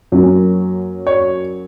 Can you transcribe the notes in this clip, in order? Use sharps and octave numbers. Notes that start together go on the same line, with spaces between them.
F#2 F#3 A#3 C#4
C#5